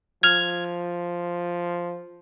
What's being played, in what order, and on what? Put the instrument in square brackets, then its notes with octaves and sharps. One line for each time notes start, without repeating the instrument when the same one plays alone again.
[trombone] F3 [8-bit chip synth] F6 G#6